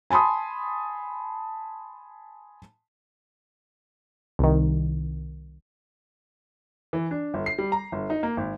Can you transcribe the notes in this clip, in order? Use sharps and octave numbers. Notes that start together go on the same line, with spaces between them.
G#5 A5 B5 C6 D#6
C2 D#3
E3
D4
G1
C7
G3
A#5
G1
D#4
A#3
G#1